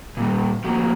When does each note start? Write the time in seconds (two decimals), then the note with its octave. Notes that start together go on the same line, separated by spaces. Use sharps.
0.17 A#2 G3
0.64 F3 A3 A#3 C4 F#4 A#5